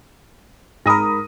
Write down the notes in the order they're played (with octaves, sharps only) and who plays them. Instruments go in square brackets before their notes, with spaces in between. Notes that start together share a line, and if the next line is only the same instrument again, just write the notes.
[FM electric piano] G#2 A#4 [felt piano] B5 D#6 A#6